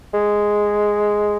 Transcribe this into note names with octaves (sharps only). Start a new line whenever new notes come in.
G#3